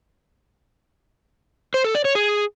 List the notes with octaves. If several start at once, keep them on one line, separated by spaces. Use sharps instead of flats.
C5
A4
D5
C#5
G#4